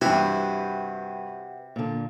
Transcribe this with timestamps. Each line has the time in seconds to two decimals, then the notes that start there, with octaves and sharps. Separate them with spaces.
0.02 G2 C3 E3 E4 F#4 G4 B4
1.76 A#2 D3